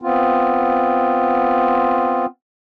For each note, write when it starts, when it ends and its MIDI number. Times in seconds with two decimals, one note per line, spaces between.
0.02 2.26 59
0.02 2.26 60
0.02 2.26 65